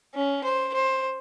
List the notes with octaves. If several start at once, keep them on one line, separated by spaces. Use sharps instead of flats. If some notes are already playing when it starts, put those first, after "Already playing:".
C#4
C5
C5